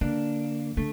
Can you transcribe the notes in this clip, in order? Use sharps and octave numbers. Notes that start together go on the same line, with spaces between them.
D3 A#3 D4
D3 A3